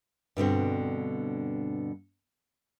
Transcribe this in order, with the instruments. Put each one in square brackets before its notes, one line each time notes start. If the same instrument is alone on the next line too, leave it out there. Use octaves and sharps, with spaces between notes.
[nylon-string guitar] G2 B2 D3 C4